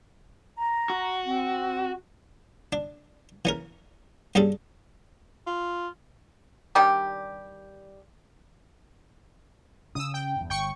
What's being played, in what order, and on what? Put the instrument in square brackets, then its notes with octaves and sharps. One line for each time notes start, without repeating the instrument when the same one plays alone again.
[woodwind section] A#5
[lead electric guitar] F#4
[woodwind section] C4
[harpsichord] D4
E3 C#4 A#4
G2 G3 C#4 G#4 A4
[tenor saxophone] F4
[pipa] D#3 G3 D4 G4
[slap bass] C#3 C#4 [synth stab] D#6 E6
[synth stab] G5
[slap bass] E2 G2
[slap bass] G1 [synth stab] G5 C#6 C#7